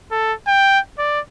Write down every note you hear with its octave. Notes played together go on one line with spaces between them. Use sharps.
A4
G5
D5